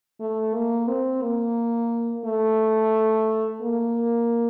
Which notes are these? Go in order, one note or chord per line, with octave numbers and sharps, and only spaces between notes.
A3
A#3
C4
A#3
A3
A#3